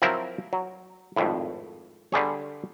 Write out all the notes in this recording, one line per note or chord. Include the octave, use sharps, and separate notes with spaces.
F3 F#3 C4 E4 A#4 C5
F#3
G#1 F2 A2
D3 G3 G#4 C#5